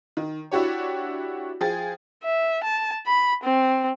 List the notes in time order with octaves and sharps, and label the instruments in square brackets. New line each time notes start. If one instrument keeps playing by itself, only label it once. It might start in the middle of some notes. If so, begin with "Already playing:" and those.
[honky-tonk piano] D#3
D4 E4 F#4 G4 C#5
F3 G#4 G5 A6
[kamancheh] E5
A5
B5
C4